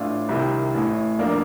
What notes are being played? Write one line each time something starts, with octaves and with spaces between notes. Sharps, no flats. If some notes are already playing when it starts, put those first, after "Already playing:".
Already playing: A1 A2 D4 F4
C2 C3 D#3
A1 A2
F1 D#3 A#3 D4